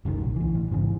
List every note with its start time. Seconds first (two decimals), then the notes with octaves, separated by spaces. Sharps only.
0.05 F#1 C2 A#2 D#3
0.21 A#1
0.36 D2 E3
0.55 A1
0.71 G#2 C#3 E3